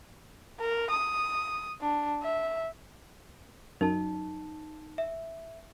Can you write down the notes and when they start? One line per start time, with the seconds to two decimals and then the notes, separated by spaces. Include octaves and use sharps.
0.60 A#4
0.90 D#6
1.81 D4
2.23 E5
3.81 F#2 D#4 A5
4.98 E5